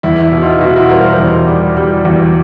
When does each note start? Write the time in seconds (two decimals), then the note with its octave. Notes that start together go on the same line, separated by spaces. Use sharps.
0.03 E2 E4
0.22 E4
0.32 B2
0.41 D#4 F4
0.61 B2 E4 F#4
0.76 E4 F#4
0.89 G3 A#4 C5
1.04 A#4 C5
1.18 E2
1.47 G3
1.77 G3
2.05 E2